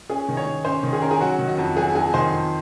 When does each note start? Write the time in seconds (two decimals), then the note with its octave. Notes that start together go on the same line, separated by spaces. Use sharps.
0.09 C#4 G#4
0.29 D#3
0.37 C#5
0.46 D#3
0.65 C#4 C5
0.83 D#3
0.93 G#4
1.02 C#4 A#4
1.11 G#4
1.21 F#3 F#4
1.39 D#3
1.48 F#4
1.58 F2
1.77 F#3 G#4
1.95 F2 G#4
2.13 D#3 C5
2.32 F2